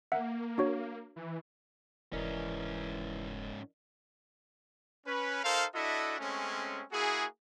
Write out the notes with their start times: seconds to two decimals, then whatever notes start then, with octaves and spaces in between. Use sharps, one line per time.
0.12 A#3 E5 F#5
0.58 D4 F#4 C#5
1.16 E3
2.13 F1 G#2 E3 C#4 A#4 D5 D#5
5.06 C#4 B4
5.43 D#4 A4 A#4 C5 F5
5.75 D4 E4 F#4 A4 D#5 E5
6.19 G#3 A3 C4 C#4
6.92 A#3 E4 F#4 G#4